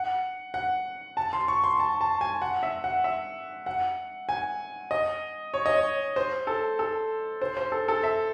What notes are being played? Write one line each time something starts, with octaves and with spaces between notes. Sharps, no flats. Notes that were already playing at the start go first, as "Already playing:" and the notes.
Already playing: F#5
F#5
A5
C6
C#6
C6
A5
A5
G#5
F#5
E5
F#5
E5
F#5
G#5
D#5
C#5
D#5
C#5
C5
A4
A4
C5
C5
A4
A4
E5